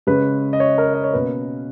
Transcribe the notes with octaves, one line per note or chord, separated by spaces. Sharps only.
C#3 G#3 C#4 B4
D#5
C#5
A#4
D#5
C#5
B2 A#3 C#4 B4